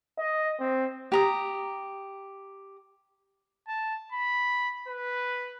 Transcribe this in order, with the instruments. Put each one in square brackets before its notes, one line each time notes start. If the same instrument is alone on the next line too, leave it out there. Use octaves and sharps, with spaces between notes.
[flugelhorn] D#5
C4
[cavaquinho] G4 A#5 D#6
[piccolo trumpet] A5
B5
B4